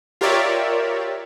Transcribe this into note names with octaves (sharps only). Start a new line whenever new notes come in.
F4 G4 A#4 C#5 D5 E5